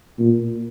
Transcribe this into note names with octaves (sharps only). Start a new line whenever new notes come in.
A#2